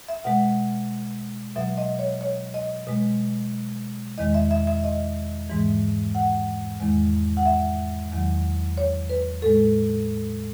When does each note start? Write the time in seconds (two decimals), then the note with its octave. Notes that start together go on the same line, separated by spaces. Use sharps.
0.08 E5
0.24 B2 G#3 F#5
1.56 B2 F#3 E5
1.77 D#5
1.99 C#5
2.21 C#5
2.54 D#5
2.87 B2 G#3
4.18 E2 D#3 G#3 D#5
4.34 E5
4.51 E5
4.67 E5
4.84 D#5
5.49 G#2 E3 G#3
6.15 F#5
6.80 E2 D#3 G#3
7.37 F#5
7.46 E5
8.12 E2 D#3 F#3
8.77 C#5
9.10 B4
9.42 A2 G#3 A4